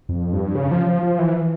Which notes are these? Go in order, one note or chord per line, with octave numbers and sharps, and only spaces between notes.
F2
G2
C#3
F3
F3
F3
E3